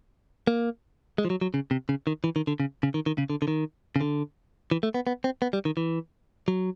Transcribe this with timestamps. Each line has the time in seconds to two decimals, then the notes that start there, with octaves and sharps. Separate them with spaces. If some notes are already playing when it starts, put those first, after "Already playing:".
0.47 A#3
1.18 G#3
1.25 F3
1.30 F#3
1.41 F#3
1.54 C#3
1.71 C3
1.89 C#3
2.07 D#3
2.24 E3
2.36 D#3
2.47 D3
2.60 C#3
2.83 C#3
2.94 D#3
3.06 D#3
3.18 C#3
3.30 D3
3.42 D3
3.48 D#3
3.96 C#3
4.01 D3
4.71 E3
4.83 A3
4.94 B3
5.07 B3
5.24 C4
5.42 B3
5.53 G3
5.65 D#3
5.77 E3
6.48 F#3